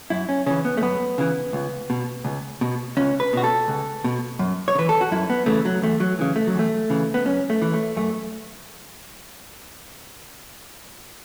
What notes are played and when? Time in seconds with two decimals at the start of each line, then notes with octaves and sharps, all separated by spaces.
0.10 F#2 E4
0.29 C#4
0.46 C#3 E3 C#4
0.65 B3
0.77 A3
0.82 F#2 B3
1.18 C#3 E3
1.53 C#2
1.90 B2
2.25 C#2
2.61 B2
2.97 C#2 C#4
3.20 B4
3.33 B2 F#4
3.44 A4
3.68 C#2
4.04 B2
4.39 F#2
4.68 C#5
4.75 C#3
4.78 E3 B4
4.89 A4
5.01 F#4
5.11 F#2 E4
5.30 B3
5.46 C#3 E3 A3
5.65 F#3
5.82 E2 A3
6.00 F#3
6.19 C#3 E3
6.36 A3
6.47 F#3
6.55 E2 A3
6.90 C#3 E3
7.14 B3
7.26 F#2 C#4
7.50 A3
7.62 E3
7.74 A3
7.97 F#2 A3